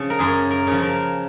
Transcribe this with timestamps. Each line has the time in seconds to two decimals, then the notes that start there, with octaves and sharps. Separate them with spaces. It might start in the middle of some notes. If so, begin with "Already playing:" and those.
Already playing: C#3 F3
0.10 A#4
0.19 F#2 G#4
0.50 A#4
0.67 C#3 F3
0.82 A#4